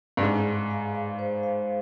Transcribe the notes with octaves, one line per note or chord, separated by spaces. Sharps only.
G2
G#2 G#4
G#4
F5
F5
C5
F5